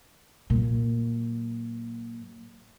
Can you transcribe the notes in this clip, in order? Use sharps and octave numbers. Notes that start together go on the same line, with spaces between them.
A#2 F#3